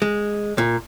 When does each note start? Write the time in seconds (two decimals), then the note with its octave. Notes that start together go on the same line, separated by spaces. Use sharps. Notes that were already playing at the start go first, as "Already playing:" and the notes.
0.02 G#3
0.58 A#2